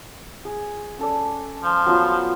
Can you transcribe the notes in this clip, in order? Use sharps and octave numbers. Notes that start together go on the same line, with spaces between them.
G#4
C#4 A4 D5
F3
F#3 B3 F4